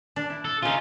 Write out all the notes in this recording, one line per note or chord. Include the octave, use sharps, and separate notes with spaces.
D4
E4
A4
C#3 C#4 D#4 F4